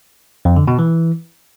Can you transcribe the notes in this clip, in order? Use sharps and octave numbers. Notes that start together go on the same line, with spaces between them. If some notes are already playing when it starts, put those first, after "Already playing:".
F2
D3
B2
E3